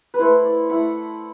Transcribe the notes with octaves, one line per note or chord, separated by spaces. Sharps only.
B4
A3 E4 C5
D5
A3 E4 F#5